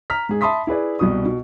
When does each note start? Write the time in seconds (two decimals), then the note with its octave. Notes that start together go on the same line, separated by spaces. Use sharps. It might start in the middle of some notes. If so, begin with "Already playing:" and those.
0.10 A#5 F6 B6
0.29 G#2 G#4
0.41 E5 A5 B5 C6 D#6 B6
0.67 E4 G#4 B4 D5
0.99 C2 B2 D#6
1.25 B2